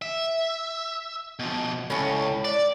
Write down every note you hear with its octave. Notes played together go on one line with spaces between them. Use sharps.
E5
B2 F3
C#2 A2 C#4
D4 D5